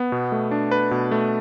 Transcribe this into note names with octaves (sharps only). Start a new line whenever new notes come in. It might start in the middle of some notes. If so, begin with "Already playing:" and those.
Already playing: B3
B2
A3
D4
B4
B2
A3